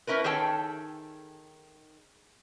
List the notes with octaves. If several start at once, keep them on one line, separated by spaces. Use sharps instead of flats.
C#4 E4 A#4 B4
D#3 G#4 A4 C#5 G5 A5